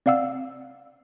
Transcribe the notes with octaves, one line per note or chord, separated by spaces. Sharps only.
C4 D5 F5 F#5 E6